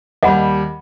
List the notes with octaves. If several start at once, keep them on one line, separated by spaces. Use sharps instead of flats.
D#2 G3 D#5 F#5 B5